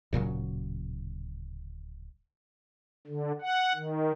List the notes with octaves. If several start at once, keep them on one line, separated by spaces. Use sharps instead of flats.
D1 A#2 C#3 F#3
D3
F#5
D#3